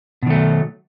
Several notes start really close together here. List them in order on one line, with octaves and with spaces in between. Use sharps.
B2 D#3 A3 F#3